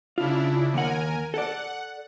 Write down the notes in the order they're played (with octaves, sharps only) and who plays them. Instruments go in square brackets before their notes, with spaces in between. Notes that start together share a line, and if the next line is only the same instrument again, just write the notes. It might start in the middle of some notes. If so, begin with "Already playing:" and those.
[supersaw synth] C#3 D4 E4 [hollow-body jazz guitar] F4
[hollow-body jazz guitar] D#2 F#5 [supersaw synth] A#4 G#5
[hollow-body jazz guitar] A4 D5 [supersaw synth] F#5